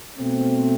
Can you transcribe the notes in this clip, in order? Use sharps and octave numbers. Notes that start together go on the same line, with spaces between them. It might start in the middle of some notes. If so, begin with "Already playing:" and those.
B2 A3 C4